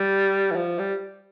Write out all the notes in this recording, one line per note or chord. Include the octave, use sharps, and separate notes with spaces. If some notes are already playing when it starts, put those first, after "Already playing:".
Already playing: G3
E3
F3
G3